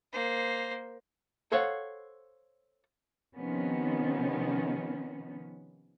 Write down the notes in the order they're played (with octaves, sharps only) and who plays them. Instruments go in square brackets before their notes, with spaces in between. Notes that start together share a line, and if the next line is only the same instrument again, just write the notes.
[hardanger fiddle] A#3 C5
[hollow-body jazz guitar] A4 C5 C#5 F5 F#5
[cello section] C3 D#3 F3 B3 C#4